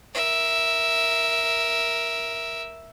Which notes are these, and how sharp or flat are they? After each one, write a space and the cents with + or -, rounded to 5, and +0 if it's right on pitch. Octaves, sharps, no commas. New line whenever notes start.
A#4 +5 E5 +0